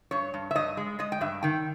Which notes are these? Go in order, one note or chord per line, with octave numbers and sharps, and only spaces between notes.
G2 C#5
G2
E5
G2 D#5
G#3
G#3 D#5
G5
G2 E5
D#3 G5